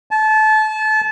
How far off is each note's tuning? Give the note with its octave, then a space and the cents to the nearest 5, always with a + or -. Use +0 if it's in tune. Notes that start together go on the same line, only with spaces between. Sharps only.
A5 -25